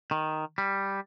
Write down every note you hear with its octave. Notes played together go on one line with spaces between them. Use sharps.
D#3
G3